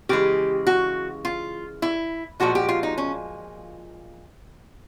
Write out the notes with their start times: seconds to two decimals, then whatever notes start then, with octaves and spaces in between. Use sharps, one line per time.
0.09 C#3 E3 G#3 G4
0.67 F#4
1.25 F4
1.82 E4
2.40 A#2 F3 G#3 F#4
2.55 G4
2.69 F4
2.83 D#4
2.98 C#4